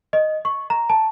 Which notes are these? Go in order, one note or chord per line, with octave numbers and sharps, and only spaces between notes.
D#5
C#6
A#5
A5